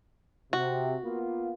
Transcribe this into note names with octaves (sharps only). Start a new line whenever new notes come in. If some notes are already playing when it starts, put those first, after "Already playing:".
C3 F#4
A#3 B3 F4